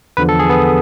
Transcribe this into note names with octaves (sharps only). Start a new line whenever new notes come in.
E2 D3 F3 B4
A4
G#4
B3